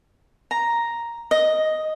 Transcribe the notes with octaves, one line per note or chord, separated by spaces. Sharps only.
A#5
D#5